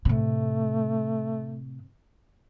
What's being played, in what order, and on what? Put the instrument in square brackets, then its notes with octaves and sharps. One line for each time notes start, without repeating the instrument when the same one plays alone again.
[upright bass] A2 C3 [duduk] A3